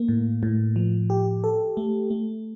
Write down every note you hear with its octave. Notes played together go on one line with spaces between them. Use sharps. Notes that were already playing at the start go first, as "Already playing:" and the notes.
Already playing: A#3
A2
A2
F3
G4
A4
A3
A3